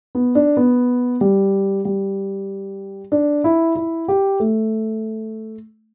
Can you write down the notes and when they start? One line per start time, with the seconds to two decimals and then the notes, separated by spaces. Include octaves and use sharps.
0.15 B3
0.35 D4
0.57 B3
1.21 G3
1.85 G3
3.12 D4
3.44 E4
3.76 E4
4.08 G4
4.40 A3